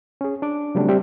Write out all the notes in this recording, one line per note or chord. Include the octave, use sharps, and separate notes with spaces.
C#4 G#4
D4 D6
C#3 F#3 G3 A3 C4 D4
G3 C4 G4 E5